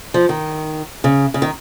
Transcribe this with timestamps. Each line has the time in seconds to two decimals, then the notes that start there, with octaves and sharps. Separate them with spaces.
0.14 F3
0.29 D#3
1.04 C#3
1.34 C#3
1.42 D#3